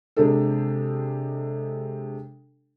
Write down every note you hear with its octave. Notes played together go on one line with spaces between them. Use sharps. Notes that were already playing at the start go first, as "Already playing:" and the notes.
C3 G#3 D4 G4 A4